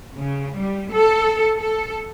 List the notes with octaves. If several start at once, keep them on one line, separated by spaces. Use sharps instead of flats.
C#3
G3
A4
A4